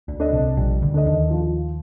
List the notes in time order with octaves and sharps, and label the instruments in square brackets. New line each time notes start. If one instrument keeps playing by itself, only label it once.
[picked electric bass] D2 D3
[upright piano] D4 A4 D#5
[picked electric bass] C2 C3
[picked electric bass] A#1 A#2 [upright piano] G3
[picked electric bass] D2 D3
[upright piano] D4 A4 D#5
[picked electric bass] D#2 D#3
[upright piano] F3